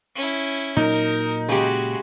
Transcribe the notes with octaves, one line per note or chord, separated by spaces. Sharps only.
C#4 E4
A#2 F#3 D#4 A#4
C#3 G#3 F#4 G4